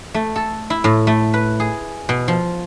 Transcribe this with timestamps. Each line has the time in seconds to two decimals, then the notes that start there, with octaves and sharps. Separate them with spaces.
0.14 A3
0.36 A4
0.70 E4
0.84 A2
1.07 A3
1.34 B4
1.60 G#4
2.09 B2
2.28 F3